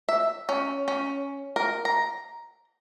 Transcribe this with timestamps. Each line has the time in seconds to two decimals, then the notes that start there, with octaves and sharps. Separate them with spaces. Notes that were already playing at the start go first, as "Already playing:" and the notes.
0.09 E5
0.49 C#4
0.88 C#4
1.56 A#4
1.85 A#5